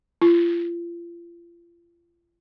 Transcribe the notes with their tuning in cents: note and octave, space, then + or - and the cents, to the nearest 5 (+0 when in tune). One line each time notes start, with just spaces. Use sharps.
F4 -35